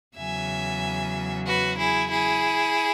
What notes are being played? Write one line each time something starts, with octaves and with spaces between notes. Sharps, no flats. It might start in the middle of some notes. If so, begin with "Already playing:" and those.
E2 C#3 F#3 E5 G#5
F#4 B4
E4 G#4
E4 G#4